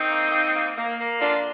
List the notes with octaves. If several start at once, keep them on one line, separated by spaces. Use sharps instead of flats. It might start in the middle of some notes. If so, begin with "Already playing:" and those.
Already playing: D#3 C4 D#4
A#3
A#3
A#3
A#3
A#3
D3 D4 F4